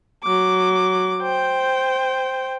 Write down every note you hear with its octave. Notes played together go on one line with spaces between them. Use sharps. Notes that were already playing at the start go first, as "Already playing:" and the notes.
F#3 D6
C5 G5